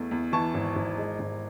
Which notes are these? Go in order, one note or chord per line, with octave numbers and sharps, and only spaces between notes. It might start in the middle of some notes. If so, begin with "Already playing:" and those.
Already playing: E2 A3
E2
E3 A5 C#6
G#1
G#1
G#3
G#1